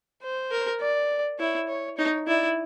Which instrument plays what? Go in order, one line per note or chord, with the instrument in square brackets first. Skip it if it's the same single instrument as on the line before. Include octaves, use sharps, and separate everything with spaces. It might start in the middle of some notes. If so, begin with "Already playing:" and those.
[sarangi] C5
[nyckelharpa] A#4
[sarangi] D5
[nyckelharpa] E4 [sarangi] C#5
[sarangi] C#5
[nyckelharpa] D#4 [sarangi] C#5
[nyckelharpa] E4 [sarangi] D5